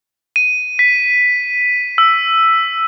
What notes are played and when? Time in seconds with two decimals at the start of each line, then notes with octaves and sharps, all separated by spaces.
0.36 D#7
0.79 B6
1.98 E6